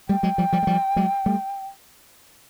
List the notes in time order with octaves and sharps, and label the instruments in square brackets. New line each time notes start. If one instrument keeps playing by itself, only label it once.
[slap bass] G3 A3 [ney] G5
[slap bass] F#3 G#3
F3 G3
F3 G3
G#3
F3 G3
F#3 G#3
G3 A3